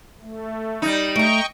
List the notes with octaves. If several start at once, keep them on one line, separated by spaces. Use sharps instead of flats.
A3
G3 D#4
A3 D#5 G5 A#5 C#6 D7